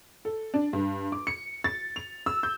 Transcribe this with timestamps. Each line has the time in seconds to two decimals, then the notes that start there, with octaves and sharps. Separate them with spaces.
0.25 A4
0.54 D4
0.73 G2
1.12 D6
1.27 C#7
1.64 A6
1.96 F7
2.26 E6
2.43 G6